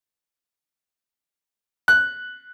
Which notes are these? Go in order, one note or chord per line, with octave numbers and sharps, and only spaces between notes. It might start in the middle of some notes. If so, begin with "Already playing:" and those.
F#6